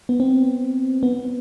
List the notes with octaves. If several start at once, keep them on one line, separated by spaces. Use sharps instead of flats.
B3
C4
B3